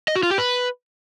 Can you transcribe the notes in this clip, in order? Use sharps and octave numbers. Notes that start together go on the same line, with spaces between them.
D#5
F#4
F4
G4
B4